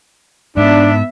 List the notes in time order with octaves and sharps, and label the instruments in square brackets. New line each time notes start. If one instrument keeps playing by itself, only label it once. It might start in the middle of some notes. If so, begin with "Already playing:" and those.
[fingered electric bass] G#2 [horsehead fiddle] B3 E5 [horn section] D4